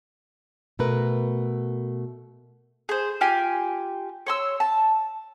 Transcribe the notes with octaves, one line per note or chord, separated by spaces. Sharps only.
B2 A3 A#4 B4
G#4 C5
F4 G4 G#5
C#5 C6 E6
A5